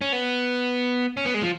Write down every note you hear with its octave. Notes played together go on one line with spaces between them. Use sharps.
C#4
B3
C#4
B3
G#3
F3